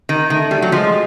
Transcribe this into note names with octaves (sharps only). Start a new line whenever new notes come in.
D#3
D#3 A3
G3
F#3
F3 G#3